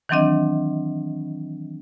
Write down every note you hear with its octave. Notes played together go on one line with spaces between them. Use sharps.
D#3 E3 F#3 C4 D4 D#5